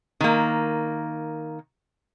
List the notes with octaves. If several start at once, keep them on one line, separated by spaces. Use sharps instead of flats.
D#3 A#3